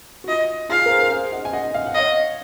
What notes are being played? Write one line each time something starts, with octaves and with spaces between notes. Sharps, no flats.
F#4
F4 D#5
F4 G#4 F5
A#4
G#4 C5
A#4
G#4 C5
D#5 F#5
G#5
D#5 F#5
F5
F#5
C#5 D#5 F5